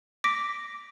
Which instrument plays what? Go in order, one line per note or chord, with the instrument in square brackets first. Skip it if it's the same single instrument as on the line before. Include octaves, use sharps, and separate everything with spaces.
[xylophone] D6 A#6 B6 D7